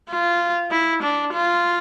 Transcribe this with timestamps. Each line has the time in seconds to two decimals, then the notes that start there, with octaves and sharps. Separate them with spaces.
0.09 F4
0.71 E4
1.02 D4
1.33 F4